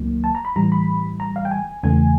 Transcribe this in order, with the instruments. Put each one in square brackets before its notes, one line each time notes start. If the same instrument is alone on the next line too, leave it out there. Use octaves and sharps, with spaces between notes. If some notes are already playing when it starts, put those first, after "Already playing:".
Already playing: [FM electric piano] C#2 D#3 F#3 A#3
A5
A#5
B5
A2 E3 G3 A#5
B5
A#5
F5
G5
G#5
E2 C#3 E3 A3 G#5